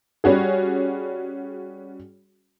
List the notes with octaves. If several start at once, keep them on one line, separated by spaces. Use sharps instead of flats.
G3 C#4 F#4 G#4